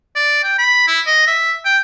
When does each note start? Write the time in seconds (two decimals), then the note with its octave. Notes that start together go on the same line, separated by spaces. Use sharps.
0.16 D5
0.43 G5
0.58 B5
0.87 E4
1.07 D#5
1.27 E5
1.65 G5